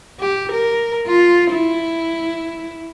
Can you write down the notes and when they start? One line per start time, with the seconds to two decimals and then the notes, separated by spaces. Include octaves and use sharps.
0.20 G4
0.52 A#4
1.06 F4
1.51 E4